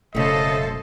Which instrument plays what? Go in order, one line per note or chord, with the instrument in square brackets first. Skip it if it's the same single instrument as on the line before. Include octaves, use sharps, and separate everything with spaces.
[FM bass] E1 [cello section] F#2 A4 C5 [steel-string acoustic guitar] C#3 A3 [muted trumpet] D#5